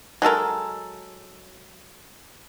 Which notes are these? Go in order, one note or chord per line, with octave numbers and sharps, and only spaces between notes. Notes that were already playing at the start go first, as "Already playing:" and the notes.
F#3 G#3 A4 A#4